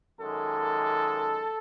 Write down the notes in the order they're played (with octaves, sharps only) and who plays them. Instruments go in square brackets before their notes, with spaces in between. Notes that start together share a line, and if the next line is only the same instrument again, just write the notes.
[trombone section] F#2 D#3 G#3 A4